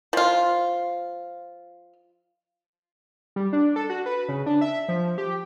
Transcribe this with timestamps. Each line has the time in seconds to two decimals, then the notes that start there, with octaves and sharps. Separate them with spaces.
0.13 F3 F4
3.36 G3
3.53 D4
3.76 A4
3.90 F#4
4.06 B4
4.29 C#3
4.46 D4
4.61 E5
4.89 F3
5.18 G4